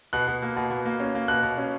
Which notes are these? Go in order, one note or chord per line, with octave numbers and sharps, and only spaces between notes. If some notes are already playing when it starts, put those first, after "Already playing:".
B2 F#6
B2
A#3
B2
B2
A#3
C#4
A#3
B2 F#6
B2
C#4